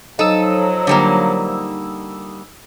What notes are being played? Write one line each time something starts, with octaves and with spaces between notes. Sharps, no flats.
F3 F#3 D#4 A4 D#6 E6
D3 G3 A#3